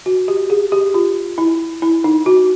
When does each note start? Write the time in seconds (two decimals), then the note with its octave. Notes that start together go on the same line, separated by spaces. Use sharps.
0.06 F#4
0.28 G4
0.50 G#4
0.72 G4
0.94 F4
1.38 E4
1.82 E4
2.04 D#4
2.26 F#4